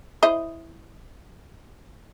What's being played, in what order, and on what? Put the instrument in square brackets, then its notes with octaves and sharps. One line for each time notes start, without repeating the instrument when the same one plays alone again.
[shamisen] E4 C5 D#5